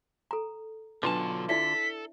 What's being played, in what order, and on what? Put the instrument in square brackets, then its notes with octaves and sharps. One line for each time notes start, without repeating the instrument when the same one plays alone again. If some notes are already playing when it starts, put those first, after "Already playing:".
[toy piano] A4 A#5
[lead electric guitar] B2 F#3 [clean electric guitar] D3 F4 A5 [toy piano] D4 B4
[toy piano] E4 D5 E5 [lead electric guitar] A4 [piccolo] B6